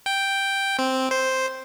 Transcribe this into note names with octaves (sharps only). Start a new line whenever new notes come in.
G5
C4
C5